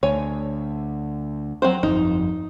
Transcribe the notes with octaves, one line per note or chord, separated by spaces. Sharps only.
D2 C#5 G#5
F#3 C4 C5
G1 F2 D#4